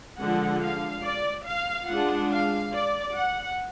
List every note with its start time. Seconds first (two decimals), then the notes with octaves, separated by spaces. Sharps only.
0.19 D3 F3 G#3 F#5
0.62 F5
1.04 D5
1.46 F5
1.88 G#3 D4 F4 F#5
2.31 F5
2.73 D5
3.15 F#5